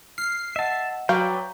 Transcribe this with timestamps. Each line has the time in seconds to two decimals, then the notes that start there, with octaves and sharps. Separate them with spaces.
0.18 F6 C7
0.56 D#5 E5 F#5 A5
1.09 F#3 B4 D5 F5 G5 A#5 C#6